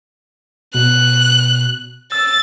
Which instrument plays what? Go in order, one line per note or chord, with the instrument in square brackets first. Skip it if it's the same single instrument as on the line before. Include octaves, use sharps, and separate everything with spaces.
[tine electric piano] B2 [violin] F#6
[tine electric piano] E6 [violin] A6